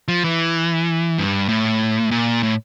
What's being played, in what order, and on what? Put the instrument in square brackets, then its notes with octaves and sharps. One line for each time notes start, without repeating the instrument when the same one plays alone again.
[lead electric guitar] F3
E3
G2
A2
A#2
A2